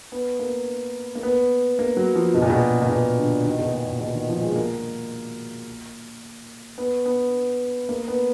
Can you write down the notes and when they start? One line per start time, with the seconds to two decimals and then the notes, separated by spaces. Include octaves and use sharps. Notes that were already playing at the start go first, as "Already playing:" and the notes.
0.12 B3
0.39 A#3
1.15 A#3
1.23 B3
1.79 A#3
1.97 F#3
2.15 F3
2.34 B2
2.42 A#2
2.50 B2
2.82 A#2
2.89 B2
3.18 D3
3.45 D#3
3.59 B2
3.73 A#2
3.87 A#2
4.01 B2
4.14 D#3
4.29 F3
4.42 G#3
4.56 A#3
6.78 B3
7.05 B3
7.89 A#3
8.08 B3